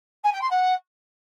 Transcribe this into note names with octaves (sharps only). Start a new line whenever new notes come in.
G#5
G5
C6
F#5